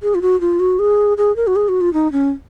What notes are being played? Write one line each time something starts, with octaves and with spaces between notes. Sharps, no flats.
G#4
F4
F#4
F4
F#4
G#4
G#4
A#4
F#4
G#4
F#4
F4
D#4
C#4